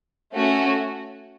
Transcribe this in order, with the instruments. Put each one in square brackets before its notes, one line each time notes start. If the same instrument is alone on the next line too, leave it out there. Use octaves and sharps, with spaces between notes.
[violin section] A3 C#4 F#4